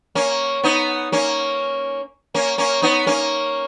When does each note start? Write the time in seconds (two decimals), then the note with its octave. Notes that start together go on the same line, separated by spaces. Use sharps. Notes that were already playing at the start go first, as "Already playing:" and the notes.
0.15 A#3 C#4
0.63 B3 D#4
1.12 A#3 C#4
2.34 A#3 C#4
2.58 A#3 C#4
2.82 B3 D#4
3.07 A#3 C#4